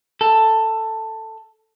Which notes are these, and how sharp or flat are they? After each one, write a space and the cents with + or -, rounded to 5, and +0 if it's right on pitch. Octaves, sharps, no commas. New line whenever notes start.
A4 +10